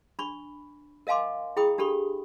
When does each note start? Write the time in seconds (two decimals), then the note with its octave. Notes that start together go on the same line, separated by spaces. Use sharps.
0.19 D4 B5 C#6
1.07 A#4 D#5 F5 G#5 C6 D6
1.57 E4 G#4 G5 B5 D#6
1.78 D4 G4 A4 B5 C#6